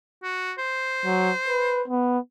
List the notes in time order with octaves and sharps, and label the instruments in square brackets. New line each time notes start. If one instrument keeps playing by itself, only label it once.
[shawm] F#4
C5
[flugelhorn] F#3
B4
B3